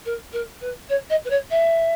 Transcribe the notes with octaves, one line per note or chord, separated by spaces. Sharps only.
A#4
A#4
B4
C#5
D#5
B4
C#5
E5